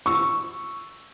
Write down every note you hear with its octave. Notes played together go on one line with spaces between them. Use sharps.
C#6 E6